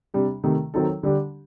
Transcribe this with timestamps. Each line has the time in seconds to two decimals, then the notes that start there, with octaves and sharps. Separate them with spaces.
0.14 C3 G3 D4
0.44 C3 D#3 A3
0.74 D#3 F#3 C4 D#4 A4
1.03 D3 G3 D4 G4